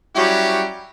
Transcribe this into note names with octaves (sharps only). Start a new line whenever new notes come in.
F#3 G3 C#4 E4 G4